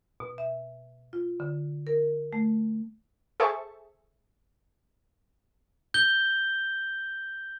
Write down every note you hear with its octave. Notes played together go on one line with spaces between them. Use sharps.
B2
E5
F4
D3
A#4
A3
G#4 A4 C5 E5 A5 C#6
G6 G7